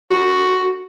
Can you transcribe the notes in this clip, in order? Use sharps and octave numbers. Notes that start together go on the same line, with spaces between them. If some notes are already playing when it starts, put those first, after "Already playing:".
F#4